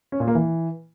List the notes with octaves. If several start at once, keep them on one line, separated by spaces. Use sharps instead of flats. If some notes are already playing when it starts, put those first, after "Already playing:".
C#4
A#2
A#3
E3